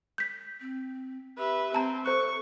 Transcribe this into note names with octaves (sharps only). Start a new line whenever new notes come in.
G6 B6
C4
G4 B4 E5
C4 A5 A#5
A4 C5 C#6 F#6